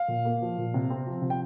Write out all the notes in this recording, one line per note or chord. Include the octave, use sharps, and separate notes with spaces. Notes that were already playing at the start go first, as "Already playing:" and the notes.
Already playing: F5
A#2
A#3
F3
A#2
C3
C4
F3
C3
G5